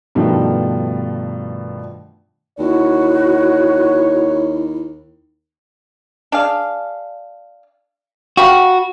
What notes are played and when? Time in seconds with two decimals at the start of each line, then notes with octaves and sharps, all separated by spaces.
0.15 G2 B2 D#3 F3 A3 D4
2.58 D#2 E4 F#4 C#5
6.32 D4 G#4 F5
8.37 F#4 G4 F5 B5